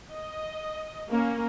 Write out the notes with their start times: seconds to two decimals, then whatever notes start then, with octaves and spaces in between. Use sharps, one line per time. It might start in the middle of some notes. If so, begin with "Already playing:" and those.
0.12 D#5
1.10 A#3 C#4